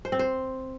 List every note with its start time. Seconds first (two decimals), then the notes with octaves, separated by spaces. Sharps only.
0.05 C5
0.12 C4
0.19 C5